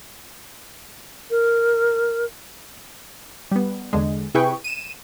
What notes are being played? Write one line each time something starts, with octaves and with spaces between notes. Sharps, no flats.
A#4
G3 B3
E2 D3 G#3
C3 E4 G#4 B4 G5 C#6
D#7 E7